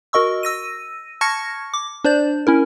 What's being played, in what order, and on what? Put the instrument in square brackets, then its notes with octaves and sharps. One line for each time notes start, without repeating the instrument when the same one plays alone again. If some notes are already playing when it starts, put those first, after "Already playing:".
[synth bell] F#4 A#4 D#5 C#6 E6
E6 A#6 D#7
A5 C#6 F6 G#6 A#6 C#7
D6
D4 C5 D5 G6
C#4 E4 A#4